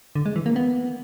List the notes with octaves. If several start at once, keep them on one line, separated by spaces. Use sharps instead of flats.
D3
G#3
E3
A#3
B3